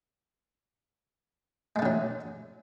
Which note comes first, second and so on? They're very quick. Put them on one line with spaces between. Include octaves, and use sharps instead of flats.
G#3 A3 D3 F#3